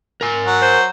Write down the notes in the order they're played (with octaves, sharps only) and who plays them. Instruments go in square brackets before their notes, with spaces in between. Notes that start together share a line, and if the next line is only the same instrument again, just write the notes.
[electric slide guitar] A#4 G#5
[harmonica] F#3 F#5
[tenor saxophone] C5